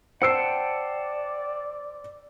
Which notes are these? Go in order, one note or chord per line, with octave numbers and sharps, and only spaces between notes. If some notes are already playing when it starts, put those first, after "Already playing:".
C5 D5 F#5 G5 A5 E6 C7